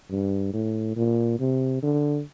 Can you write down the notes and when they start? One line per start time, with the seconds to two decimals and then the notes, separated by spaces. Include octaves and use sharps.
0.10 G2
0.53 A2
0.96 A#2
1.40 C3
1.83 D3